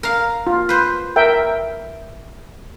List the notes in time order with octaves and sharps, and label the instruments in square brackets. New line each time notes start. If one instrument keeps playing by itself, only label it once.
[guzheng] A#4 F5
[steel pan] F4
[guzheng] B4 C5
[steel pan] A#4 E5 G5